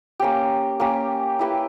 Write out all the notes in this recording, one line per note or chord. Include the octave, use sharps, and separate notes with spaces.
A#3 C#4 G4
A#3 C#4 G4
E4 G4 B4